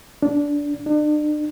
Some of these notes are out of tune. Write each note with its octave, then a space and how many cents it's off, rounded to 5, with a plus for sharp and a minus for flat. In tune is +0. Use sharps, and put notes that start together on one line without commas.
D4 -15
D4 +40